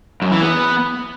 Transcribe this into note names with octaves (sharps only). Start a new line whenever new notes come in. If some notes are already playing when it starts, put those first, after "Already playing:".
F#2
E3
B3